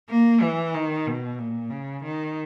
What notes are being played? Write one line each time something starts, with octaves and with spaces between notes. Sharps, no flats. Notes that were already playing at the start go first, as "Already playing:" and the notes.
A#3
E3
D#3
B2
A#2
C#3
D#3